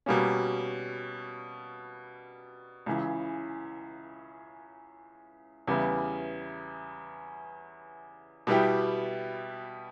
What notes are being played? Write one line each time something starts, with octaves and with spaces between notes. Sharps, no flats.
B2 G3 A#3 C#4
C#2 C#3 E3
E2 C#3 G3 B3 E4
B2 G3 B3 E4 G4